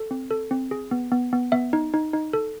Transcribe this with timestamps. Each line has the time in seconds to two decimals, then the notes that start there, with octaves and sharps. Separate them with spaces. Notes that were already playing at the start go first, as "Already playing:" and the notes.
Already playing: A4
0.11 C4
0.31 A4
0.51 C4
0.71 G#4
0.91 B3
1.12 B3
1.33 B3
1.52 B3 E5
1.73 D#4
1.94 D#4
2.13 D#4
2.33 A4